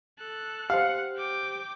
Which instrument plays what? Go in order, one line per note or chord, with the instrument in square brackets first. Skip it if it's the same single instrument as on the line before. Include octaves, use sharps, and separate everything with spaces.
[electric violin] A4 F#6
[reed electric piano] G4 C5 [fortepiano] F5 [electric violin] F#5
[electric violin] G5 D6